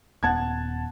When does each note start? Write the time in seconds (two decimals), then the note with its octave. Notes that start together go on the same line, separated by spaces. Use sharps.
0.23 D#1 B3 F#5 A5 G#6